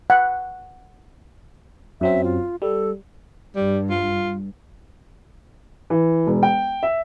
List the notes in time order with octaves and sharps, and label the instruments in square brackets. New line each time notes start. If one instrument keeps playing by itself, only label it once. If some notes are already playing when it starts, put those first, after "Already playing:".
[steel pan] F#5
[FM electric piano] F#2 F#3 C4 [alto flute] E5
[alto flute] F4
[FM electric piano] G3 [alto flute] A4
[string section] G2 [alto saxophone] G3
[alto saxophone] F4
[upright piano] E3
E1
G5
E5